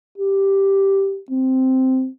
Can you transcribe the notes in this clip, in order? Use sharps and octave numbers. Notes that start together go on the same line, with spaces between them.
G4
C4